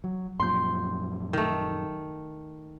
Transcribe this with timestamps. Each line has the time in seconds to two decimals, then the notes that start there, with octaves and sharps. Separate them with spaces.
0.04 F#3
0.40 F#2 A#2 F3 C6 G6
1.33 D#3 A3